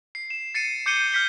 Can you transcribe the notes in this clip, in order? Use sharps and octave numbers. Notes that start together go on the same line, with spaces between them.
C7
E7
A6 C7 C#7 D#7
D6 G6 C7 C#7 D#7 G7
F6 G6 B6 C#7 G7